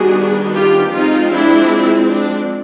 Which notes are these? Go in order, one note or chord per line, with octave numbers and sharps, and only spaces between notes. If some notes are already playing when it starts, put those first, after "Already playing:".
Already playing: D#3 G3 B3 D4 F#4 G#4
F4 G4
F3 G#3 C4 D#4 F4
D4 E4
D4